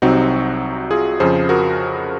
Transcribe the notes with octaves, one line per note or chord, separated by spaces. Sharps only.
C2 C3 F#3 C4 D#4 F#4
F4 G#4
F2 C#3 F3 G#4 C5
F#4 A#4